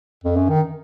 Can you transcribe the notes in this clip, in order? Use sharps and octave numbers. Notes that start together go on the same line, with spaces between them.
F2
F#2
D#3